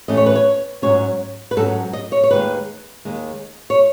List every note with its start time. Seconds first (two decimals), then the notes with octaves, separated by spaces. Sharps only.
0.08 A2 E3 A3 C#4 D#5
0.17 C#5
0.26 B4
0.35 C#5
0.82 G#2 F#3 C#4 C#5
1.51 B4
1.57 G#2 F#3 C#4 A4
1.93 D#5
2.12 C#5
2.23 C#5
2.31 D#2 D#3 G#3 B4
3.05 D#2 D#3 G#3
3.70 C#5